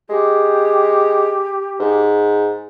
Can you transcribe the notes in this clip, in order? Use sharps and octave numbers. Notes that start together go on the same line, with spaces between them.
G#3 G4
G#2